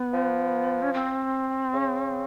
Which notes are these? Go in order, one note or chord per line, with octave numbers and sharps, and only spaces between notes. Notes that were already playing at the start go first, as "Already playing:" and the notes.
Already playing: B3
F3
C#4
C4
C#3